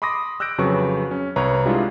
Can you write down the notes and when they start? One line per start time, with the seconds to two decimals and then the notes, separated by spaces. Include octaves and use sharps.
0.02 B5 C6 D6 D#6 A#6
0.40 E6 F#6 G6 A#6 D7
0.58 F2 C#3 F#3 B4 C#6
1.11 C#4
1.36 C2 B4 C#5 A#5
1.66 G3 G#3 D4 E4 F4 G#4